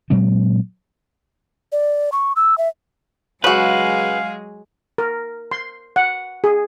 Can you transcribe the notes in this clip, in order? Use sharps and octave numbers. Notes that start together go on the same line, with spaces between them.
A#2 F#3 G#3 C4
D5
C#6
E6
E5
C#3 F#3 G#3 F#4 G#4 B4 F5
A#4
C6
F#5
G#4